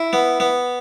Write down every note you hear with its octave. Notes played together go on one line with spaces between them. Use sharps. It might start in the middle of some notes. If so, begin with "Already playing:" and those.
Already playing: E4
B3
B3